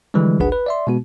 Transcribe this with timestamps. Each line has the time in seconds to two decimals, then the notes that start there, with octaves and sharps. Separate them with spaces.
0.14 D3 E3 F3 G3 G#3
0.40 G1 C#2 D4 G#4 B4 F#5
0.52 B4
0.66 D5 E5 C6
0.87 B2 G#3 B3 F#4